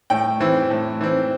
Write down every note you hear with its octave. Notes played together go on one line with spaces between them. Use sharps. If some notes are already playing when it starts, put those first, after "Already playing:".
A2 G5
E3 C4
A2
E3 C4